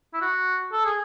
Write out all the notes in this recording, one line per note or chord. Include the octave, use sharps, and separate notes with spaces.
E4
F#4
A4
G#4